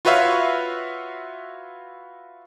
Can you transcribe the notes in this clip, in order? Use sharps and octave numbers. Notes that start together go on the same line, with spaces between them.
F4 F#4 B4 C#5 E5 F5